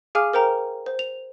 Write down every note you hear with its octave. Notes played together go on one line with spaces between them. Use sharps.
G#4 F5 G#5 D6 F6
A#4 C5 G5 A#5
C5
F7